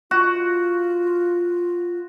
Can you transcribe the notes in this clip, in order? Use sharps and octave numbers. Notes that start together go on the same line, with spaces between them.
F4 F#4